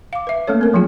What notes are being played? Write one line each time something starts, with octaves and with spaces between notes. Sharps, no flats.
F5 D6
B4 E5
A3 A#3 C#4 A4 C#5
C4 A#4
F3 F#3 B3 F4 G#4